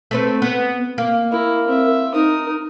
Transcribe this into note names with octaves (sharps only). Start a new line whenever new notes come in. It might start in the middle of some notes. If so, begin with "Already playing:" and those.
A3 C4 B4
B3
A#3
E4 A#4
C4 E5
D#4 A#4 D#6